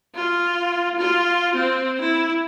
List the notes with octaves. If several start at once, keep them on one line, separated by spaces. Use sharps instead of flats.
F4
F4
C4
E4